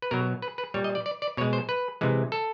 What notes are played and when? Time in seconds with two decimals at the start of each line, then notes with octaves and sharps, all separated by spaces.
0.02 B4
0.11 B2 F#3 A#4
0.42 B4
0.58 B4
0.74 A#2 G3 C#5
0.84 D#5
0.95 D5
1.06 D5
1.22 D5
1.37 B2 C#5
1.41 G#3
1.53 C5
1.69 B4
2.01 C3 E3 G#3
2.32 A4